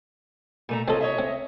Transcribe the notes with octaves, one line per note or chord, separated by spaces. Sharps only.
A#2 A3 A#5
C4 F4 A4 C#5 D#5
C#5 D#5 E5
C4